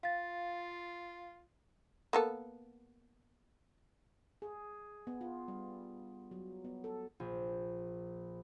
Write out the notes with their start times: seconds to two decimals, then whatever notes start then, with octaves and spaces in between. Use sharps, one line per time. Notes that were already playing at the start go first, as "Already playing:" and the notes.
0.03 F4 F5 A6
2.13 A#3 B3 A4
4.42 G#4
5.07 B3
5.21 F4
5.48 G3
6.31 F#3
6.65 B3
6.84 A4
7.20 A#1